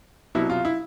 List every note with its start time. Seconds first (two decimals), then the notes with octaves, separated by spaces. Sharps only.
0.35 C2 B2 F#3 E4
0.50 F4
0.65 E4